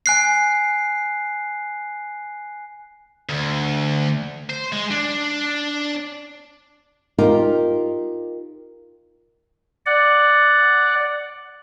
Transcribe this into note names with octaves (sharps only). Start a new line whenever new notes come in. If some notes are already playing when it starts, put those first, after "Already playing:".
G#5 F#6 C7
D2
C5
G#3
D4
D#4 F4 G4 A#4
D5 F#5